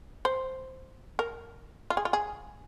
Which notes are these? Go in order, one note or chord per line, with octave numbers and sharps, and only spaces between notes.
C5
A#4
F4
G#4
F4
G#4